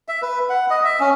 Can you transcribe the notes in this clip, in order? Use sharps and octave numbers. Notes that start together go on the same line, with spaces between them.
E5
B4
F#5
D#5
E5
C#4